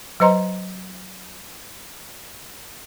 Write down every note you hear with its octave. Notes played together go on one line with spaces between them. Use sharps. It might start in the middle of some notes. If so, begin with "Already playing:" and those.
F#3 B4 C5 D#5 A#5 C6